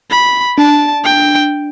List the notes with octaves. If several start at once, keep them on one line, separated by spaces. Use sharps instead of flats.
B5
D4 A5
G5